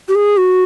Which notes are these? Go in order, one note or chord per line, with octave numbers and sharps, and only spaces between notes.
G4
G#4
F#4